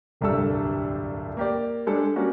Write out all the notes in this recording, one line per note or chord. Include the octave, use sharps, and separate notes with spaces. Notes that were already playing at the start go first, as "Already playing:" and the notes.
D1 C2 G2 G3 A4 E6
A#3 G4 D5
G3 G#3 D4 A4
G3 A#3 C#4 F#4